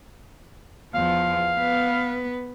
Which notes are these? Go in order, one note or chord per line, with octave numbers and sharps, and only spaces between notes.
E2 F3 F5
B3 B4